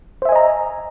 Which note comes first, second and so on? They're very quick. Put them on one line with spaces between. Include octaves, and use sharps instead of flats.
C5 E5 G#5 D#5 A#5